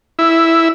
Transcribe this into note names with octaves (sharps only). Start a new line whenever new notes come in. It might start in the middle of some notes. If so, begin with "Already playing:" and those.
E4